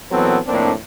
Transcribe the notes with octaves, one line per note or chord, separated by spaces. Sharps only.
A#2 E3 F#3 B3 C4 A4
F2 A2 A#3 C4 D4